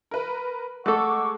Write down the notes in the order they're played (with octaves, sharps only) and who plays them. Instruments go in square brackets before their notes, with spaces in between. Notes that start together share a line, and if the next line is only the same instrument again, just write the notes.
[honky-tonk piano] A#4 B4
[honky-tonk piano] G#3 [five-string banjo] A3 A4 [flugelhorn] F#5 [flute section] C#6 D6 E6